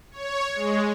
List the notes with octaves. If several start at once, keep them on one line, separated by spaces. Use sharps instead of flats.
C#5
G#3